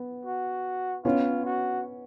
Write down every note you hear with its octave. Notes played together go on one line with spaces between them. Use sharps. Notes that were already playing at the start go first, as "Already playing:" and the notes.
Already playing: B3
F#4
B3 C#4 F4
F#4